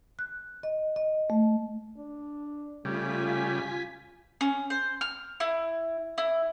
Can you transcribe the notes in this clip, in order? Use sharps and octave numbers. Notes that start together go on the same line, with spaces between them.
F#6
D#5
D#5
A3
D4
C#3 G3 A3 F4 G#5 B6
C#4
C5
F6
E4
E4